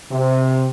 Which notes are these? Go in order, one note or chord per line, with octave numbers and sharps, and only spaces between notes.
C3